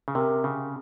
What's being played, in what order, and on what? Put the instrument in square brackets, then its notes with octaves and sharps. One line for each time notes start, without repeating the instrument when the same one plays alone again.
[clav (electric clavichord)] C#3
[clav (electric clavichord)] C3 [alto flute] A#4
[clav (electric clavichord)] C#3